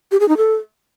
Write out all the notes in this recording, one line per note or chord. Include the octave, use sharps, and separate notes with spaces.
G4
G#4
D#4
A4